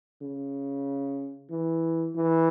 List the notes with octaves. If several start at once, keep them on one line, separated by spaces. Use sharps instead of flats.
C#3
E3
E3